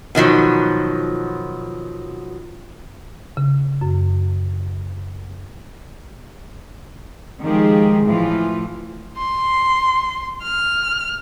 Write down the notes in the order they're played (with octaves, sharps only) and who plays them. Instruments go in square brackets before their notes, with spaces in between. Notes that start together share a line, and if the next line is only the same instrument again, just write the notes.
[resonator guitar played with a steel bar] B2 D#3 F3 F#3
[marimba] C#3
F#2
[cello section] D#3 F3 G#3 G4 G#4
A2 E3 F3 F4
[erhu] C6
F6